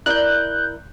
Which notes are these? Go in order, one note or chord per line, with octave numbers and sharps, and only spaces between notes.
E4 A#4 D5 F#6 G6